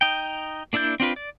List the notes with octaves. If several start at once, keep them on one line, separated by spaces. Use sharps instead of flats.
D#4 G5
A#3 D4 E4 D5 G6
C4 D4 F4 B4
D5